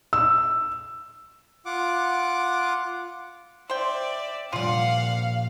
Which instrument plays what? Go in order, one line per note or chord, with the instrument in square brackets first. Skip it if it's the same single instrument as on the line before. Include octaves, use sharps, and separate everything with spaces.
[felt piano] E6
[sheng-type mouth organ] F4 F#5 D6
[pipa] C5 G5 [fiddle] D5 E5
[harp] A#2 F3 G3 [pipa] F4 D5 [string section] F5 [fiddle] F#5